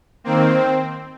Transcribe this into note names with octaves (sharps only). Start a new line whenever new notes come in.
D#3 A#3 C4